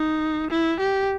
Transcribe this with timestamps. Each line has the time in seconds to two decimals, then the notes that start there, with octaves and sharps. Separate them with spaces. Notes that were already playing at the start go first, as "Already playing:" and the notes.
Already playing: D#4
0.50 E4
0.80 G4